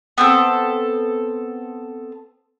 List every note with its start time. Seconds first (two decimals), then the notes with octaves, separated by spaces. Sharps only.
0.18 B3 C4 A4